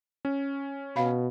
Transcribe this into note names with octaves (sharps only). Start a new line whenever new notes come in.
C#4
B2 F5 B5